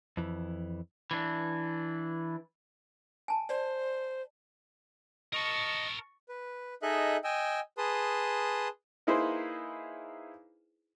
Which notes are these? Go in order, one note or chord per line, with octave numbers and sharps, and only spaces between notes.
F2 E3
E3 D4
G#5 A5
C5 D5
A#4 D#5 A5 C#6 A6
B4
D#4 G#4 A4 D#5 E5 F#6
D#5 G5 G#5 E6
G#4 B4 A5 C6 D#6
A#3 D#4 E4 G#4 B4 C5